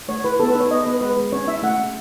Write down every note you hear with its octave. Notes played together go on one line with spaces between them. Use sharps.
A3 C#5
E4 B4
B3 A4
B4
D#4
C#5
B3 D#5
B3 B4
G#3 B4
G#3
C#4 C#5
E4 E5
A3 F#5
C#4